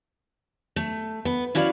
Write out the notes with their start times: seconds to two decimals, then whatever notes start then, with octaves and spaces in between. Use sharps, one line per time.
0.76 A3
1.25 B3
1.55 C#4 E4 F#4 D5 F5